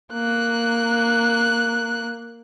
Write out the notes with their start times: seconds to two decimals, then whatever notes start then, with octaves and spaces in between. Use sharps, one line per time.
0.13 A#3 F#6